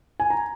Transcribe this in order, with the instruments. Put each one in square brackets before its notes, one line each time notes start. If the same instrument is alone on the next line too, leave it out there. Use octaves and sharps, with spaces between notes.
[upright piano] G#5
A#5